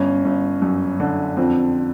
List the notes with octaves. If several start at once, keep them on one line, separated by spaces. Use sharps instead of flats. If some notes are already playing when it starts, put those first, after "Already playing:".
Already playing: G1 C#4
G1
F#2
D3
F2 C4